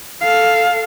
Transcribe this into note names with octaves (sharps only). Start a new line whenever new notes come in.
A4 F5